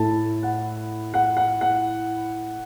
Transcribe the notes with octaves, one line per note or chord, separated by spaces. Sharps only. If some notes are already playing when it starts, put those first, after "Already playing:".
Already playing: A2 A3 E4 A5
F#5
F#5
F#5
F#5